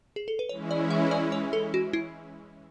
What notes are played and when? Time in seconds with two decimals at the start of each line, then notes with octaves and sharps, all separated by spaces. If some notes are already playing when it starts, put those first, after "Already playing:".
0.16 G#4
0.28 A4
0.39 B4
0.49 E3 G#3 C#4 E4 C#5
0.71 D5
0.90 E5
1.11 D5
1.32 C#5
1.53 A4
1.74 F#4
1.93 E4